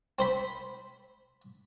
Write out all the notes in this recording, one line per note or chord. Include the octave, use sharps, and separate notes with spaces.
C4 C5 B5